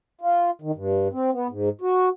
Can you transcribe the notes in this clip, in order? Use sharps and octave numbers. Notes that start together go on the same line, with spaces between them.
F4
D#3
G2
C4
B3
G#2
F#4